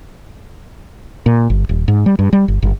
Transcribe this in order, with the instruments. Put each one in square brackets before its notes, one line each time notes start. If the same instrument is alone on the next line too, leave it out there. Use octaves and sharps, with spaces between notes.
[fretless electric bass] A#2
G1
D#1
G#2
G3
G2
G3
G1
G1